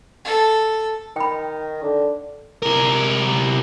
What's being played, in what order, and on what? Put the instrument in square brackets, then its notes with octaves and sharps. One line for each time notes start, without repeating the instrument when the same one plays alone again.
[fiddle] A4
[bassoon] D#3 [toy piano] G5 B5
[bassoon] D3
[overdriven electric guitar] C3 A#4